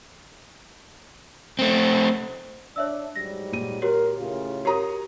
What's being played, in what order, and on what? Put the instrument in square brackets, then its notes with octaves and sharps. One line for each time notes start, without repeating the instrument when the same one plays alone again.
[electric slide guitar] A3 C4
[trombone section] D4 [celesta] C#5 E5 E6
[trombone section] G#2 F#3 G3 [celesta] A#6
[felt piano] A#2 D#7
[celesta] F#4 G4 C#5 [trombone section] A#4
[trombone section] A2 C#3 F4
[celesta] F#4 G4 A#4 [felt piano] C#5 A#5 D#6